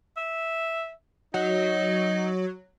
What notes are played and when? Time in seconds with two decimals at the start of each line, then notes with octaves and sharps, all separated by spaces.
0.17 E5
1.34 F#3 D#4